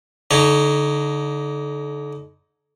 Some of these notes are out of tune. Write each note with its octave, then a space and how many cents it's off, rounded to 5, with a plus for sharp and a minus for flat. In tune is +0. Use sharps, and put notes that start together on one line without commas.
D3 -30 D#4 +0 C#5 +0